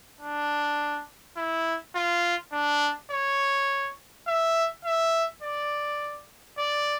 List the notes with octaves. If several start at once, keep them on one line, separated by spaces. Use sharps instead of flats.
D4
E4
F4
D4
C#5
E5
E5
D5
D5